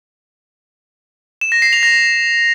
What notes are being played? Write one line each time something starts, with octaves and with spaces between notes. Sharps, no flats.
E7
A#6
C7
F7
A#6